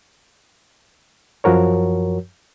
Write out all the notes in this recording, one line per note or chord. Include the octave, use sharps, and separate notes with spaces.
F#2 F3 F#4 A#4 C#5